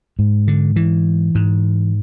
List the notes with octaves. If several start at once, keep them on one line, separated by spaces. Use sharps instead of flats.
G#2
D3
E3
G#2